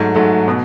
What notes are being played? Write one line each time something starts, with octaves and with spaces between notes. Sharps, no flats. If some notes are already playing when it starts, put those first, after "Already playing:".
Already playing: G#2 F#3 A3
G#2 F#3 A3
B2